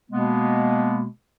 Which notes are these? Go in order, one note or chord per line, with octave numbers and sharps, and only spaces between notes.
B2 G#3 A#3 B3